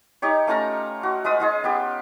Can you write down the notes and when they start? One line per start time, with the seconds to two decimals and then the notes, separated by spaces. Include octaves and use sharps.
0.22 D#4 G4 C#5
0.47 A3 C#4 F4 A#5
1.03 F#4
1.25 G#3 F4 B4 D#6
1.40 G#3 F4 G#4
1.64 B3 G4